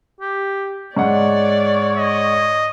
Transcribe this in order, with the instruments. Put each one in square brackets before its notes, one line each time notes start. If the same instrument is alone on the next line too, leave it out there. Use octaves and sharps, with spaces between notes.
[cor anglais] G4
[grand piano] G#2 F#5 [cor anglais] C#5 [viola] D5
[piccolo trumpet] D#5